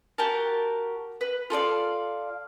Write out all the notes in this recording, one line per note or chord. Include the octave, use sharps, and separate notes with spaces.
F#4 G4 A#4 A5
B4
F4 A4 D5 F5